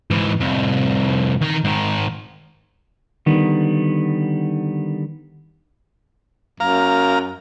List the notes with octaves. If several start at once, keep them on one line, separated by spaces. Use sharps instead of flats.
G#2 E3
C2 F2
D#3 A#5
G#2 D#3
D3 D#3 G3 B3
F#2 F5 A#5